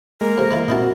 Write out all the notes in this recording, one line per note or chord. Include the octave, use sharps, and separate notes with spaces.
G#3 A#3 A#4
F2 C3
D#3 E4 F4
A#2 C4 D#4 E4 F#4 A#4 A5